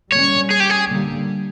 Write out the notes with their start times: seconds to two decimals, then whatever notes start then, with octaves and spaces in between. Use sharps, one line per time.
0.12 D3 G3 A#3 C#4 C#5
0.51 G#4
0.60 G4
0.70 G#4
0.89 D3 G3 A#3